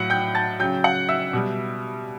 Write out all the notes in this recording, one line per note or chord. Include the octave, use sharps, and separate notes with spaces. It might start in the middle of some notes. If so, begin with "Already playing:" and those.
Already playing: A2 F#3 F#5
G5 G6
A5 A6
C#3 F#3 G5 G6
F#5 F#6
E5 E6
B2 G3